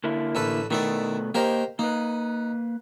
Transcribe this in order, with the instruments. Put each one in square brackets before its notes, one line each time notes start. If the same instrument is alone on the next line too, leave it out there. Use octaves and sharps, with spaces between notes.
[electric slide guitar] D3 A#3 E4
[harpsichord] A1 A4 B4
[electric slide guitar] B2 A3 B3 [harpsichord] D#3 E4 D5
[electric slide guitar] A#3 D#5 [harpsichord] G4 A#4 C5
[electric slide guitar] A#3 B4 [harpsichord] D#4